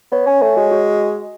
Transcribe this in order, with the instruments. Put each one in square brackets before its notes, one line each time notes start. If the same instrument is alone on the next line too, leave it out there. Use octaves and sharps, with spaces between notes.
[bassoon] B3 [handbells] C#5
[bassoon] C#4 [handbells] G#5
[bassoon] A3 [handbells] C#5
[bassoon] G#3 [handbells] F#4
[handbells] F#4